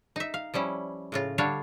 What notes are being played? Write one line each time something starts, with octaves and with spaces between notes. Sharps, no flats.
D#4 E5
F5
F3 G3 C#4 E4
A2 C#3 F4
D3 G3 D4 C#5 F5